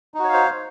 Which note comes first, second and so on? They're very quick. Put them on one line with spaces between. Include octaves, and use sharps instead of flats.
D#4 F#4 C#5 F5 C5